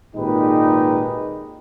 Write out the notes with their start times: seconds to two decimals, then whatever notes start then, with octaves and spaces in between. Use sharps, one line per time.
0.16 G#1 A#2 G#3 D#4 G4 B4